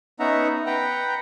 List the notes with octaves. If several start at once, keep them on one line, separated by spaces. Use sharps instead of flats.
B3 C#4 D#4 E5 F#5 A#5
B4 F#5 G5 A#5